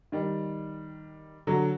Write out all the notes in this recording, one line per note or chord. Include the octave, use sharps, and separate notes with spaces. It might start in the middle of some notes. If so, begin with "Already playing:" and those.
D#3 G3
D3 F#3